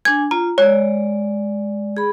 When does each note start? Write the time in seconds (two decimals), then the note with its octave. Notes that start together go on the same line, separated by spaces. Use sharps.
0.05 D4 G#5 G#6
0.31 F4 A#5
0.58 G#3 C#5 D5
1.97 G#4 B5